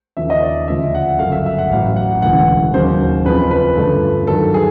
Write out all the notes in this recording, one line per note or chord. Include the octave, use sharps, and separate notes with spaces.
D#2 C#3 F3 E5
D#5
D5
D2 C#3 F3 E5
F#5
G1 F#2 C#3 F#3 A3 F5
E5
E5
F#5
A1 A2 F#3 F5
F#5
E1 D2 C#3 E3 F#5
D#2 C#3 F#3 C5
F2 C#3 F3 B4
B4
G2 D3 F3 A3
G2 D#3 F#3 A4
G#4